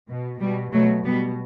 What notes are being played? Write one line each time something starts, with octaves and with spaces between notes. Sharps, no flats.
B2
B2 G3
B2 F#3 A3
B2 G3 B3